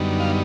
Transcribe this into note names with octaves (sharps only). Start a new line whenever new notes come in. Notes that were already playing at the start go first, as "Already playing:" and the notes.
Already playing: F#2 D3 G3 B3 D#4
F5